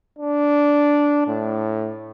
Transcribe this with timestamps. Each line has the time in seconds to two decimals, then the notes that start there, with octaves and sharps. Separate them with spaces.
0.19 D4
1.27 A2